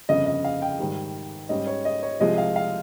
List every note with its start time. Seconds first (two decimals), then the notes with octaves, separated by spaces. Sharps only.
0.09 G1 F2 C#3 D#5
0.26 D#5
0.45 F5
0.62 G5
0.79 G#2 D#3 G3
1.49 G#2 G3 C#4 D#5
1.67 C#5
1.85 D#5
2.03 C#5
2.20 C2 C3 F3 G#3 D#5
2.38 F5
2.56 F5